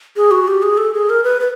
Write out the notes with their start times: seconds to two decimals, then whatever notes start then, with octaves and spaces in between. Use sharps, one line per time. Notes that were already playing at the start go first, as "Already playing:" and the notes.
0.16 G#4
0.31 F#4
0.48 G4
0.62 G#4
0.77 A4
0.94 G#4
1.10 A#4
1.24 B4
1.40 B4